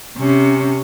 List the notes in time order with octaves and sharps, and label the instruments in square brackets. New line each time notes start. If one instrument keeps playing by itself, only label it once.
[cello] C3 C#4